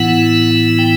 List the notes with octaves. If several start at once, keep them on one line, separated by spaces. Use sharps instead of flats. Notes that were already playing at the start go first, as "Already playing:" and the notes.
Already playing: A2 E3 B3 E4 F#5
G5